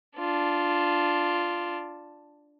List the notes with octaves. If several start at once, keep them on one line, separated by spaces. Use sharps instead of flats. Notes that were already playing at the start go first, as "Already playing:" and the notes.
D4 F4